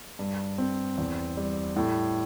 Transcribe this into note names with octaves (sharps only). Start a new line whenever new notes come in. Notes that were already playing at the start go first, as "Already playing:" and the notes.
G2
C4
E2
G3
A2